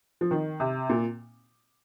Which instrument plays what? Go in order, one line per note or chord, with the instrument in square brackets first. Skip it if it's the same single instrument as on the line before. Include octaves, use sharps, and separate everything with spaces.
[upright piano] F3
D#3
C3
A#2